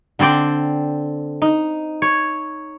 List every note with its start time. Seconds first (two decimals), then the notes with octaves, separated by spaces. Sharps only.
0.19 D3 C4 C5 D5 G5
1.42 D#4
2.02 C#5